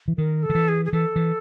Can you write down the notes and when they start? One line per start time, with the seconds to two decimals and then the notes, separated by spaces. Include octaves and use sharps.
0.08 E3
0.18 D#3 A#4
0.43 A4
0.50 D#3
0.55 E3
0.68 G#4
0.85 G#4
0.92 E3 A4
1.16 E3